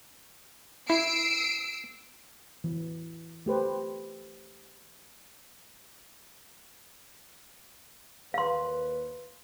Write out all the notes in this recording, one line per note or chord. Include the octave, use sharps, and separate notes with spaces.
E4 E6 C7 D7
E3
A3 G4 B4 C5
D#2 B4 F5 C6